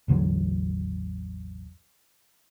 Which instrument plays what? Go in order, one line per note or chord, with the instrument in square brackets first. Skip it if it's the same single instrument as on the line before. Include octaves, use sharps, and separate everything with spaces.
[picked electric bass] A1 E2 D3 F#3